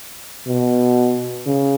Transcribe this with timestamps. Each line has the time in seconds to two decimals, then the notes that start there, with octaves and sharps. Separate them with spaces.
0.47 B2
1.46 C#3